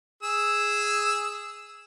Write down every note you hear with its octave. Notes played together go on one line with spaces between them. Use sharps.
G#4 E6